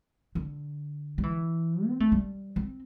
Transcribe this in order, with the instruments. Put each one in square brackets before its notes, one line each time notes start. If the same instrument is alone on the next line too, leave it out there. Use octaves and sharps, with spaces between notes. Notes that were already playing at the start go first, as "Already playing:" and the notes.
[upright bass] D3
G3
E3
C4
A3
G3
C4